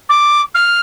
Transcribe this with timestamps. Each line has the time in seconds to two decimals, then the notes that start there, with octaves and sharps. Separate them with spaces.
0.09 D6
0.54 F6